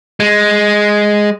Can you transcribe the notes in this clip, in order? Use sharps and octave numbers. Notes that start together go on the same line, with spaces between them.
G#3